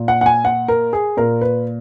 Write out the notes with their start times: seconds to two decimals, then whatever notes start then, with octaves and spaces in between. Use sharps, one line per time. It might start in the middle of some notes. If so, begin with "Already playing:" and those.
Already playing: A#2
0.08 F#5
0.21 F#5
0.26 G#5
0.45 F#5
0.68 A#4
0.93 G#4
1.17 A#2 A#4
1.41 B4